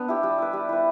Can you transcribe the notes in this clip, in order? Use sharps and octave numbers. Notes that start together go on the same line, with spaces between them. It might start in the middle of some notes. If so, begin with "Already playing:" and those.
Already playing: B3 D4 B4
E4 G4
G3
E4 B4
G3
E4 B4